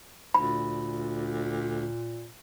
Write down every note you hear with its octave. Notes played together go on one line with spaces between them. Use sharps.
D2 A#2 B5